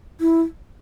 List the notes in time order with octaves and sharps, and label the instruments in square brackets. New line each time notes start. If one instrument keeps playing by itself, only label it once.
[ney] E4